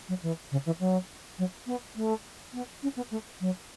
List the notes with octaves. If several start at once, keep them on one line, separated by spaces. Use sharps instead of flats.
F#3
E3
C#3
E3
F#3
F#3
B3
A3
B3
C#4
B3
A3
F#3